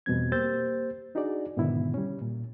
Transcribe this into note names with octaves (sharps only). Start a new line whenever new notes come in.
E2 B2 G3 C4 G#6
A#3 G4 C5 E6 G6 A6
D4 D#4 F#4 G#4 D5
G#2 B2 D3 D#3 B3 E4
G3 C#4
A#2